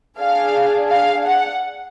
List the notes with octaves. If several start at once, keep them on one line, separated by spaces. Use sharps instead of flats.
D4 G#4 F5
F5
F#5